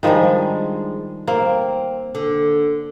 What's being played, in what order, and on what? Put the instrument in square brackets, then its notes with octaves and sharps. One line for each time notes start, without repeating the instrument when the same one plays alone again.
[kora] D#3 F3 G3 [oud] G#3 D4 G#4
[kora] A#3 [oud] C4
[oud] D3